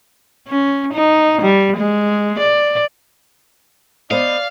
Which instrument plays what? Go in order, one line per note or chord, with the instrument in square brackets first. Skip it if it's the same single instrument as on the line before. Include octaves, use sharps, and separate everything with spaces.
[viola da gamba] C#4
D#4
G3
G#3
D5
[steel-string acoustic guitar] B3 C5 D#5 [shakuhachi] D5 [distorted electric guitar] F5